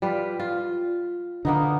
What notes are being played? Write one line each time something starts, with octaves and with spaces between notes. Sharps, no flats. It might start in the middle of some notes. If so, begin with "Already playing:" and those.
G3 F4 B4
F4
D3 A#3 B3 D#4